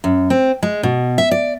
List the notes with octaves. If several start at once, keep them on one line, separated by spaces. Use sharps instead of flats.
F#2
C4
G#3
B2
E5
D5